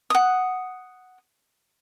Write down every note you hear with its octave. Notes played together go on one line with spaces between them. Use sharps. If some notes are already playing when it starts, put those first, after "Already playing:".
F#5 D#6